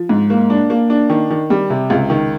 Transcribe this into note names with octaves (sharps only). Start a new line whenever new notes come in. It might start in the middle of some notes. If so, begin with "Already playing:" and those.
Already playing: F3
G#2
A#3
D4
A#3
D4
D#3
D#3
G3
C3
C#2
D#3